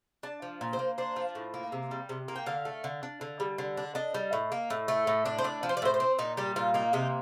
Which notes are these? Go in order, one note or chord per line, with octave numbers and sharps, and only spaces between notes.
D4 A5
F3
A#2
C5
A#3
D4 C5
F3
A2
A#3
C3
G3
C3
A#3
G5
D3 F5
A3
D3
D4
D3
G3
D3
D4
D4 D#5
G3
A2
A#3
A2
A3
A2
D4
C5
A2 D5
F3
C5
D5
A2 C5
C5
C4
A#2 D#4
G3 G4
A#2 F4
A#3 D#4
C3 D#4